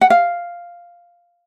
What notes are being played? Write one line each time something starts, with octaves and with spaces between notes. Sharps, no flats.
F#5
F5